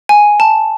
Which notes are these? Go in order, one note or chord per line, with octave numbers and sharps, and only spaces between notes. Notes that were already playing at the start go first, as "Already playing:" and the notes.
G#5
A5